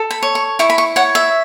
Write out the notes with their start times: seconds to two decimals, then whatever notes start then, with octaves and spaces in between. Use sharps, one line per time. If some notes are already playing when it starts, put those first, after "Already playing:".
Already playing: A4
0.11 B5
0.23 C#5
0.35 C#6
0.59 E4 C#6
0.70 B5
0.78 C#6
0.96 C#5 F#5
1.15 E5